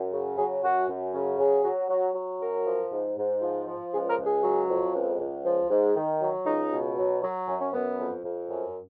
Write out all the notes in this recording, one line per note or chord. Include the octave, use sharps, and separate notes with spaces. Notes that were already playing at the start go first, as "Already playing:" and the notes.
Already playing: F#2
C#3
F#3 G#4
F#2 F#4
F#2
C#3
F#3 G#4
F#3
F#3
F#3
F#2 A#4
F3
G#2
G#2
F3
F3
C#2 G#4
A#4
C#2
G#4
F#3
F2
C#2
C#2
F3
G#2
D#3
F#3
C#2 D#4
B2
F#3
F#3
F#2 C#4
C#4
F#2 B3
F2
F2
F#2